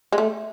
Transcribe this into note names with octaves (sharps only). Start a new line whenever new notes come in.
G#3
A3